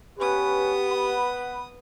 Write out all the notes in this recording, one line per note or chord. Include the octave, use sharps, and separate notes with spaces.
B3 C#4 G4 B4 D#6
F#5 B5